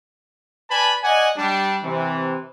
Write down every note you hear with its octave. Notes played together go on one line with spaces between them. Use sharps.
B4 D5 G#5 A5 B5
D5 D#5 F#5 G#5
G3 D4
C3 E3